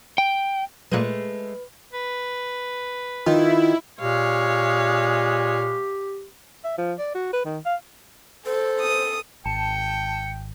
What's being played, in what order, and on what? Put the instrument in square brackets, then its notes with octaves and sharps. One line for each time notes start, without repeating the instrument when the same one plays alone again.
[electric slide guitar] G5
[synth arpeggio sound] A#2 F#6 D#7 [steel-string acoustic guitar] G#3 A3 [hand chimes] B4
[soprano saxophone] B4
[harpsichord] D#3 [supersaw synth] E4 [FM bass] F4
[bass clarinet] A#2 [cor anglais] G#3 [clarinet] G4 [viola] C#5 F5
[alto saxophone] E5
F3
D5
F#4
B4
D#3
F5
[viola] A4 [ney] C5
[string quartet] D#6
[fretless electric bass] G#1 [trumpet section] G5 [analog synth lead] A5 [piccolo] C#7